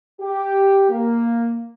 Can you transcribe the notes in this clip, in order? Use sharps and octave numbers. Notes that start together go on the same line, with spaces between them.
G4
A#3